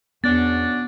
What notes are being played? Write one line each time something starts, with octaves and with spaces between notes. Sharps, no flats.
E2 B3 C#4 D4 F#4 A6